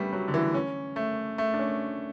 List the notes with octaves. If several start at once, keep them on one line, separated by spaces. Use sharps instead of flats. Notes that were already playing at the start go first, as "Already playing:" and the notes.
Already playing: G3 A3 B3 C#4 D4
F#3
D3
E3
C#4
A3
A3
D4
C#4